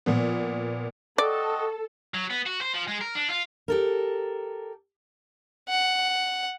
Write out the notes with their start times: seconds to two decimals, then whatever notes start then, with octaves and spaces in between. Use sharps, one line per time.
0.06 A#2 F3 B3
1.18 C4 F#4 A4 D5 D#5
2.14 F#3
2.30 B3
2.46 F#4
2.61 C5
2.74 F3
2.88 G#3
3.01 A#4
3.15 D4
3.30 F4
3.68 G4 A4 A#4
5.69 F#5